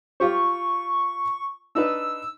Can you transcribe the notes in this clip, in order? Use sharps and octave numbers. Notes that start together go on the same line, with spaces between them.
F4 G4 C5 C#6
D4 D#4 B4 E6